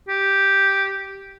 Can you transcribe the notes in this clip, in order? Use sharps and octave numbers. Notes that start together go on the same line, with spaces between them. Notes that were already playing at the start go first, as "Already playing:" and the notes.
G4